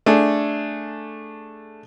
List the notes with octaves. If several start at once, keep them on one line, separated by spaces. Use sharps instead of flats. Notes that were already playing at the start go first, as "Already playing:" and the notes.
A3 D4 G#4 A4